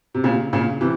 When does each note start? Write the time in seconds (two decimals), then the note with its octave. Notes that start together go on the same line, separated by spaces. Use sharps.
0.14 C3
0.24 A#2 C#3
0.53 A#2 C#3
0.81 C3 E3